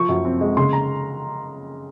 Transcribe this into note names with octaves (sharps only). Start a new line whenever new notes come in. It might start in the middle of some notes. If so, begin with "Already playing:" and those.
Already playing: F3 C#6
F#2
C4
G#3
C#3 C6
A#5